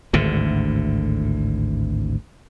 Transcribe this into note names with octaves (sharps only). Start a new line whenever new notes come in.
G#1 D2 A2 D3